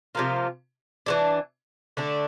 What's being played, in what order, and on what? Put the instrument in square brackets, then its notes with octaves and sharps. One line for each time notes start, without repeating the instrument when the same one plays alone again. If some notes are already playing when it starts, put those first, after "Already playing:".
[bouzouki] C3 F3 A#3 F4
E3 G3 D4
D3 A3 D4